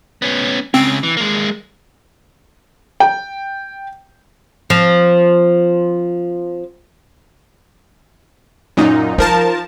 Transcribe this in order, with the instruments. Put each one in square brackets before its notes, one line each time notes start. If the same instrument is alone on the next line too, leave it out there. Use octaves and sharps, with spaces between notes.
[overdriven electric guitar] B3 C#4
[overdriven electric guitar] C#2 C#3 [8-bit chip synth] C4
[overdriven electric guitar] E3
G#3 A#3
[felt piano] G5
[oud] F3 C4
[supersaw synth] F#2 A#2 D#4
[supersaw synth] F3 A#4 A5 [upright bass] D#4